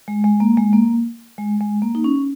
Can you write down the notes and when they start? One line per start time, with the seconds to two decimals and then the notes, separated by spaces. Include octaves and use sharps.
0.08 G#3
0.24 G#3
0.40 A#3
0.57 G#3
0.73 A#3
1.38 G#3
1.61 G#3
1.82 A#3
1.95 D#4
2.04 C#4